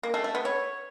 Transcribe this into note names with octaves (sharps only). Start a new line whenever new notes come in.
A#3
A3
A3
B3
C#5